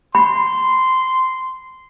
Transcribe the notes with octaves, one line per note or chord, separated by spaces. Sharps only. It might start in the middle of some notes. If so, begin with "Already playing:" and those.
B5 C6